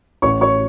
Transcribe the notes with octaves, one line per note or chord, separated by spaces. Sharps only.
A1 C#5 C#6
C#5 C#6